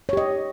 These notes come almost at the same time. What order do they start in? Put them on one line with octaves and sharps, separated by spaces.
C#5 G4 D#5